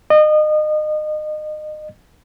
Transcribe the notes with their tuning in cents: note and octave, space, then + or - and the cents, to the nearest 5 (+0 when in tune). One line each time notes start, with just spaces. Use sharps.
D#5 -30